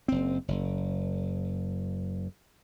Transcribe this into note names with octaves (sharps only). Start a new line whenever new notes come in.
F#1 C4
F#1